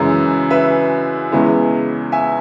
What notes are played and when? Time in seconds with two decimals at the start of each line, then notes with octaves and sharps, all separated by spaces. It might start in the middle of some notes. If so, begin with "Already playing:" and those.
Already playing: F#2 C#3 E3 G#3 E4
0.51 B4 E5
1.32 E2 C#3 G#3 B3 E4
2.12 E5 G#5